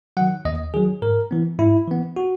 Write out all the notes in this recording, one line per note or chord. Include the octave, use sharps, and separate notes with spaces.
D#3 F#3 F#5
D#2 D#5
D#3 F#3 G#4
G#2 A#4
E3 B3
G#2 E4
E3 B3
F#4